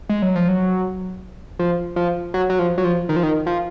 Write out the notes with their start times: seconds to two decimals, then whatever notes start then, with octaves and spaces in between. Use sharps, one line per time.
0.09 G#3
0.22 F#3
0.36 F3
0.48 F#3
1.59 F3
1.96 F3
2.34 F#3
2.50 F#3
2.59 F3
2.78 F#3
2.84 F3
3.09 D#3
3.16 F3
3.23 D#3
3.46 F3